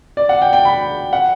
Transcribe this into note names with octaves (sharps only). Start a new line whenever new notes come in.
D5
F#5
G5
G5
B5
F#5